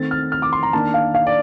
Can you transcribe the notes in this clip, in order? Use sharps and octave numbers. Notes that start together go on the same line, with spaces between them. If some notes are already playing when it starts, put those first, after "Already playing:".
Already playing: D#3 A3 C4 A6
F6
F6
D6
C6
A#5
D#3 A#3 D4 A5
F5
F5
D5